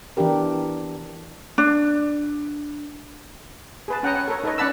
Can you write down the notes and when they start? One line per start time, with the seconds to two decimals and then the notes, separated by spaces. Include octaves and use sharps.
0.17 E3 B3 D4 G4 A#4
1.58 D4
3.88 G#4 B4 A5
4.03 C#4 F#5 G5 A#5 D#6
4.15 C#5 F#5
4.28 A4 A#4 C#5
4.44 D#4 A4 B4 C#5 D#5
4.58 C#4 D5 F#5 A5 B5 E6